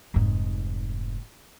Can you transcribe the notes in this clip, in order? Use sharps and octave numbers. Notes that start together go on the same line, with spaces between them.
F1 G#2